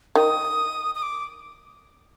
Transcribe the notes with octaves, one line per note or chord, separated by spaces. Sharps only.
D#3 D#6
D#6
D6